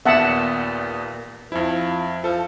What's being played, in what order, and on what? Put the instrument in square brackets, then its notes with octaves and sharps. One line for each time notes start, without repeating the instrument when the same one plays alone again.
[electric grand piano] D#2 B3 [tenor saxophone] A#2 [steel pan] E5 F#5 A5
[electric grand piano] F2 E4 [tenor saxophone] F3
[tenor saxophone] F3 [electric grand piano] A4